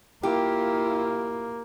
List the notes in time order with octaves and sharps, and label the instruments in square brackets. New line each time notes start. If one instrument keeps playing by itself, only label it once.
[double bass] A#3 [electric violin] E4 F4 [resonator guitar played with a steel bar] G4